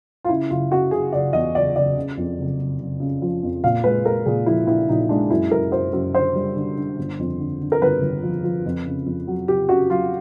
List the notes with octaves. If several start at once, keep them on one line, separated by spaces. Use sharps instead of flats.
F4
C#3 E4
F#1 F4
C#3 F#4
F#1 G#4
F#1 D5
E2 D#5
F#1 D5
F#1 D5
C#3
F2
F#1
F#1
F#1
C#3
F3
F2
A#2 F5
G#3 B4
G#3 A#4
A#2 G#4
F3 E4
A#1 E4
A#1 D#4
G#3 D4
F#2 E4
F#2 A#4
F#2 C5
F#2
D3 C5
G3
D3
D3
G1
F2
D3
D3
A#4
G1 B4
G1
F3
F3
F2
C#3
F2
F#3
F#3 G4
C#3 F#4
F#3 F4